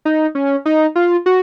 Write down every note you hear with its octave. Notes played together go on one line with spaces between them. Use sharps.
D#4
C#4
D#4
F4
F#4